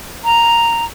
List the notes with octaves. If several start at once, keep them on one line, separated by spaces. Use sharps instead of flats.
A#5